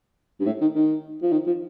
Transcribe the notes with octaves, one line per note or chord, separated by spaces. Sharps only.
G2
A2
D#3
D#3
F3
D#3
F3